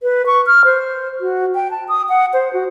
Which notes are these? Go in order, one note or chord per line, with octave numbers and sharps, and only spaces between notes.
B4
C#6
F6
C5
F#4
G5
A5
D#6
F#5
C5
F#4